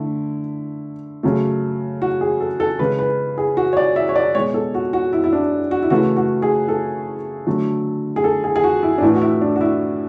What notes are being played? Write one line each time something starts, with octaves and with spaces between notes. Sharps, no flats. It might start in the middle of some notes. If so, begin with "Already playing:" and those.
Already playing: D3 A3 E4
C#3 F#3 A3
F#4
G#4
A4
A4
C#3 G#3 B4
B4
G#4
F#4
C#5
D5
E5
C#5
D5
B2 G#3 C#5
A4
F#4
F#4
E4
E4
D4
F#4
E4
C#3 E3 A3 F#4
F#4
G#4
A4
D3 F#3 A3
G#4
A4
G#4
G#4
F#4
E4
D4
A2 E3 A3 E4
F#4
E4
D4
F#4
E4